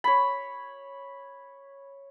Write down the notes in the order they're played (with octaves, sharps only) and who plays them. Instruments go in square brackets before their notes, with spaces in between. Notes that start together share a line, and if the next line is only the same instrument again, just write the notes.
[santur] C#5 B5